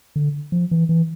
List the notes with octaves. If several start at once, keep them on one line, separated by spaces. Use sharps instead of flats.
D3
F3
E3
E3